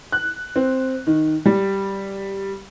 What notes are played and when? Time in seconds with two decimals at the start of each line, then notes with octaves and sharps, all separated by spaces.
0.12 F#6
0.56 C4
1.07 D#3
1.46 G3